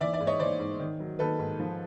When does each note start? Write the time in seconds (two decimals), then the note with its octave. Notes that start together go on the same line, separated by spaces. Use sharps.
0.01 E3 D5 E5
0.13 D5 E5
0.20 G#2
0.27 C#5 D#5
0.39 E3 C5 D5
0.59 G#2
0.79 D#3
1.00 F#3
1.19 D#3 A4 B4
1.39 G#2
1.59 F3